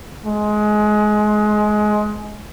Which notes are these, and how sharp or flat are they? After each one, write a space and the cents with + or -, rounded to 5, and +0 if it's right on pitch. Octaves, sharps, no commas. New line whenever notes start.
G#3 +20